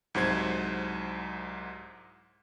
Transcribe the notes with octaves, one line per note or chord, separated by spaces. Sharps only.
C2 G#2 F#3 C5 G#6